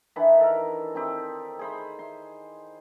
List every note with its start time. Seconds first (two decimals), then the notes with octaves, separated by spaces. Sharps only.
0.16 D#3 E3 D4 B5
0.41 A4 A#4
0.95 C4 D#4 G4
1.59 G#4 C5 B5
1.99 C6